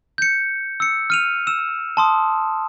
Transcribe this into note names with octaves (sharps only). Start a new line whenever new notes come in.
G6 C#7
E6 C#7
F6 D#7 F7
E6 E7
A5 C6 D#6